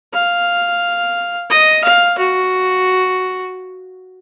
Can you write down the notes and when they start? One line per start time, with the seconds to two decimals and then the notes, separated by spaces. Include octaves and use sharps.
0.13 F5
1.50 D#5
1.84 F5
2.18 F#4